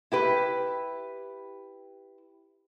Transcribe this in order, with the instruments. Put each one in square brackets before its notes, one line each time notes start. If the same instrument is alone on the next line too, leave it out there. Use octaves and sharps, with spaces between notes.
[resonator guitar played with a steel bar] E4 G4 B4